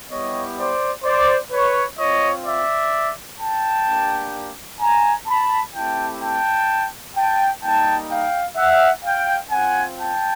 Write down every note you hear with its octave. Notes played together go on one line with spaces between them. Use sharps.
G3 B3 E4 G4 C#5 D#5
C5 D5
C5 D5
B4 C#5
C4 F4 C#5 D#5
D5 E5
G5 A5
A#3 D4 G4
G#5 A#5
A5 B5
A3 C4 E4 G4 G5 A5
G5 A5
G5 A5
G3 A#3 D#4 G5 A5
F5 G5
E5 F#5
F5 G5
C4 F4 F#5 G#5
G5 A5